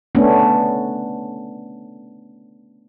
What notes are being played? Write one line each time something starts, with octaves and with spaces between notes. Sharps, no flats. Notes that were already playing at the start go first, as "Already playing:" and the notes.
A3 B3 C#4 D4